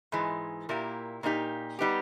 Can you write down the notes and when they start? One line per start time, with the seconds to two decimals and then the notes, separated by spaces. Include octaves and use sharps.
0.12 G#2 E3 G#3
0.69 A#2 A#3 E4 G4
1.23 A#2 A#3 D#4 G4
1.79 G3 B3 D#4 G4